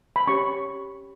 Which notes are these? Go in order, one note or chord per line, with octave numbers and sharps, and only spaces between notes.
B5
C#4 G4 C#5 C#6